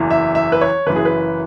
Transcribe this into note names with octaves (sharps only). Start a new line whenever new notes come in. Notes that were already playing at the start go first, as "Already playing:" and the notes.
Already playing: F#1 E2 E3
E5
E5
B4
C#5
F#1 F#2 E3 B4
G#4
B4